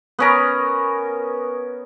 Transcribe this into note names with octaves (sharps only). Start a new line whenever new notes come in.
B3 C#4 A#4